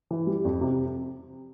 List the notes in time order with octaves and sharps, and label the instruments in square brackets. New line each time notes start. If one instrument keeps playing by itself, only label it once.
[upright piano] E3
G3
F2
C3